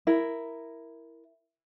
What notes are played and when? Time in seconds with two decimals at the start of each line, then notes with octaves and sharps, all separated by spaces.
0.07 E4 A#4